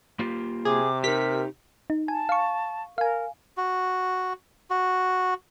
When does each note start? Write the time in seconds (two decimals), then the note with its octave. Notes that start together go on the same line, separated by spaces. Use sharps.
0.19 A#3 F4 G4
0.65 C3 G#4 D6
1.04 D#4 G4 A#4 B6
1.90 D#4
2.08 G#5 A5
2.29 F5 C#6
2.98 A#4 F5 G#5
3.57 F#4
4.70 F#4